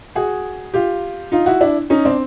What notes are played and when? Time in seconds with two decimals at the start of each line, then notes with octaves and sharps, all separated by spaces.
0.15 F#4 G#4
0.74 F4 G4
1.32 D#4 F4
1.46 E4 F#4
1.61 D4 E4
1.90 C#4 D#4
2.05 C4 D4